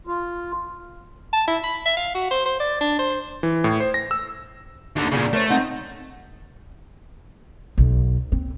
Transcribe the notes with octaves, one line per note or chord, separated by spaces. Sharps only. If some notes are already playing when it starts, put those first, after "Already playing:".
F4
A5
E4
B5
E5
F5
F#4
C5
C5
D5
D4
C5
E3
A2
C5
A#6
E6
D#2 D3
A#2 C#3 G3 A#3 B3
A3 A#4 C5 C#5
C4 D#4 F#5
B1
C4